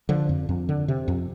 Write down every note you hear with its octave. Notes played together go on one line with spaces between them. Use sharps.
D3 F3
F2
F2
D3
C3
F2